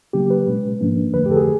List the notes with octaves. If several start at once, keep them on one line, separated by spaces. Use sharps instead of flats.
C#3 F#3 A#3 C#4 G4
B4
B2 G#3 C#4
G#2 F3 A#3 D4
F2 D3 F3 A3 B4
G4
A4
G#4